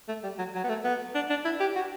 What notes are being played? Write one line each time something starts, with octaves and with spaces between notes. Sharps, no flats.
A3
G3
F#3
F#3
B3
A3
B3
D4
D4
E4
G4
F#4